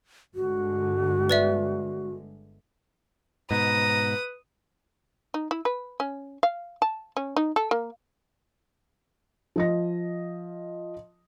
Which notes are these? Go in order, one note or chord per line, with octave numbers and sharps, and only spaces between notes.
G1 D3 G#3 F#4
B4 D5 E5
G#2 B2 B4 A#5 D#6
D#4
E4
B4
C#4
F5
A5
C#4
D#4
A4
A#3
F3 D#5 A#6